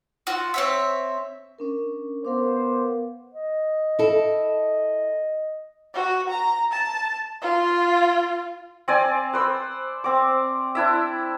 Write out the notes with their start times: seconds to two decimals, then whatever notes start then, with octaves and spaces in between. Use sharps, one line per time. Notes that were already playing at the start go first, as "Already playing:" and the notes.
0.27 F4 F#4
0.54 C4 C#5 E5
1.59 C#4 D4 A#4
2.25 B3 A#4 C5 F5 D6
3.34 D#5
3.99 E4 A4
5.94 F#4
6.29 A#5
6.72 A5
7.41 F4
8.88 C4 D5 G#5
9.33 B4 C5 E6
10.04 C4 D6
10.75 D4 E4 E5